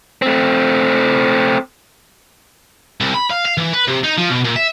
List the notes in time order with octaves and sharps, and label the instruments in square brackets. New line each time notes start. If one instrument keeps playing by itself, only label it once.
[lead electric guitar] A3 C4
[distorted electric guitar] C2
B5
F5
F5
E3
B4
C3
D#4
F3
B2
A#2
E5